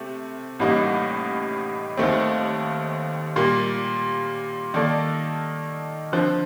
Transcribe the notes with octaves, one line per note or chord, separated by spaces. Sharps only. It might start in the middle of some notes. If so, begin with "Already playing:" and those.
Already playing: C3 A3
A1 A2 G3 A#3 D#4
D#2 D#3 A3 C4
A#2 G3 A#3
D#3 A#3 D#4 A4 D5
D3 F3 C4